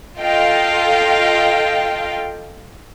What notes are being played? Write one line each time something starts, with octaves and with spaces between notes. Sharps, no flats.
F4 A4 D#5 F5 G5